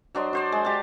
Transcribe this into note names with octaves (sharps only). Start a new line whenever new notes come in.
F#3 D4 C5 D#5
F#4 C5 D5
G#3
G4 A5